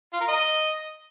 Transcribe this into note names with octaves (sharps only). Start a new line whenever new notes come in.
F4
A#4
D#5